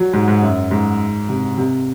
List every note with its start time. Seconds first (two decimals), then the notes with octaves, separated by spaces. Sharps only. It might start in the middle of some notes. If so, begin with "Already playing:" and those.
Already playing: F#3
0.13 G#2
0.28 G#2
0.42 F#2
0.71 G#2
1.29 C3
1.57 C3